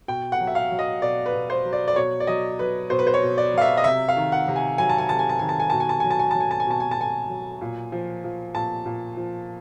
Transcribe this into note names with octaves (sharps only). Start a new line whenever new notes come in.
B2 G5
F#5
F#3
E5
F5
F#3
D#5
B2 D5
B4
B2
C5
F#3
D5
D5
B2 C#5
D5
F#3 D#5
F#3 B4
B2 C5
B4
C5
C#5
B2
D5
F#3 F5
E5
D#5
C3 E5
F5
D#3
F#5
C3
G#5
F#3 G#5
A5
G#5
C3 A5
G#5
A5
D#3 G#5
A5
G#5
B2 A5
G#5
A5
F#3 G#5
A5
G#5
F#3 A5
G#5
A5
G#5
B2 A5
G#5
A5
B2 G#5
F#3
A#2
F3
F3
A#2 A5
A#2
F3